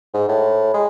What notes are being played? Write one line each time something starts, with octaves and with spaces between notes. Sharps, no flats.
G#2
A2
G#3